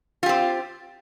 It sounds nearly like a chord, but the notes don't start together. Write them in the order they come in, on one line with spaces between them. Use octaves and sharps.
F4 G4 C4